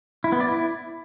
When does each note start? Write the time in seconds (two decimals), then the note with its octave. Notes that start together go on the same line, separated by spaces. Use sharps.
0.24 E4
0.32 B3
0.40 D5
0.49 E4